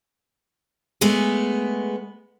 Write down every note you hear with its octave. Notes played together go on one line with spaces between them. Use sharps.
G#3 A3 B3 G#4